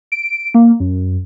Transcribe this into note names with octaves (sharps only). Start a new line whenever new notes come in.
D7
A#3
F#2